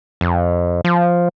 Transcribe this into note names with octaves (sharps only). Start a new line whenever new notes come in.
F2
F3